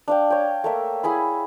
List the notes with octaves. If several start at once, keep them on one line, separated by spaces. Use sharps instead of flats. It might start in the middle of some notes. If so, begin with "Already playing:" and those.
D4 F5 G5
C#5 G5
A3 A#3 E5
E4 G#4 G#5 B5